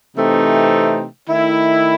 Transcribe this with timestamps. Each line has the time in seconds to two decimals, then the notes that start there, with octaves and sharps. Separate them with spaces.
0.15 C3 E3 A3 C4 D#4
1.28 D#3 A3 E4